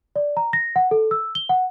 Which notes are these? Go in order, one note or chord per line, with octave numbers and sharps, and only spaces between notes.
D5
A#5
A#6
F#5
A4
E6
G7
F#5